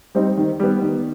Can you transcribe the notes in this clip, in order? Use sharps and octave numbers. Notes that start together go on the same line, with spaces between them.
G3 C4 D#4
D#3
G3 B3
D#3